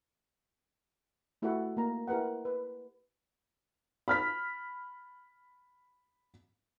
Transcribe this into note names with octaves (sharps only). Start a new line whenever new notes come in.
A3 E4 F#4 G4 A4 F#5
A#3 A#5
E4 G4 A#4 B4 F#5
B4
B5 F6 B6